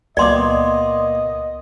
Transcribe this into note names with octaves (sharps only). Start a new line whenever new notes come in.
C#2 A#2 B3 D5 D#5 C6 D6